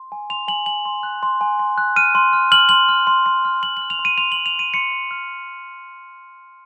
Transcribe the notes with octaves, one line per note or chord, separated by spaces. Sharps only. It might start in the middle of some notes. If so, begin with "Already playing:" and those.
Already playing: C6
G#5
C6 F7
G#5 F#7
G#5 F#7
C6
F#6
C6
G#5
C6
F#6
F6 D#7
C6
F6
F6 F#7
C6 F#7
F6
C6
C6
F6
C6 F#7
F#7
F6
F7
C6
D#7
C6 F7
F#7
C6
F7
C6 D#7
C6 C#7
C6
F6